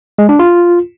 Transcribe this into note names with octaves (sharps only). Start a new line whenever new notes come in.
G#3
D4
F4